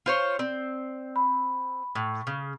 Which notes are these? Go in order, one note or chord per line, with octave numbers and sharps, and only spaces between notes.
F4 C5 C#5
C4 D5
B5
A2 C#6
C#3